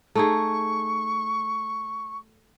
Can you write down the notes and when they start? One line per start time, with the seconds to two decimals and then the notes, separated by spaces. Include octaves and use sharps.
0.15 A3 D#4 G#4 C#6